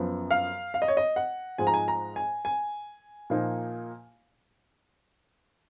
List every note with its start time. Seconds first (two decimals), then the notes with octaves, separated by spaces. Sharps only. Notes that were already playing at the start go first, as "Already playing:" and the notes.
Already playing: F#2 F3 B3
0.31 F5
0.74 F5
0.82 D#5
0.88 C#5
0.97 D#5
1.16 F#5
1.58 G#2 F3 G#3 D#4 G#5
1.67 A#5
1.74 G#5
1.88 A#5
2.16 G#5
2.45 G#5
3.30 A#2 F3 A#3 D#4